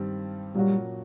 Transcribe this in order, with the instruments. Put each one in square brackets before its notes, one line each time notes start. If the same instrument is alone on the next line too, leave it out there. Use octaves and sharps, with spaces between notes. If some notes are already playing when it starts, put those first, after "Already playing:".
Already playing: [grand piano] G2 D#3 G3 C4
[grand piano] A#2 F#3 A#3 C#4 F#4 [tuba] G3